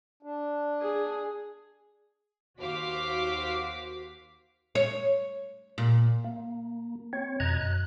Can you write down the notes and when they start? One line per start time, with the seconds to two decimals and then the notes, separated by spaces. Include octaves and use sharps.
0.23 D4
0.82 G#4
2.58 D#2 F#4 C5 F5 D6 B6
4.75 C#5
5.78 A#2
6.24 A#3
7.13 C4 C#5
7.40 F2 B2 D#5 A#5 F#6 G#6
7.61 F#2 F#6